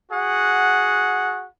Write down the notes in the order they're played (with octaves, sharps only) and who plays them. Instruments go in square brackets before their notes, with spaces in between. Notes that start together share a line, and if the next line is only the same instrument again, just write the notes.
[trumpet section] F#4 G#4 F#5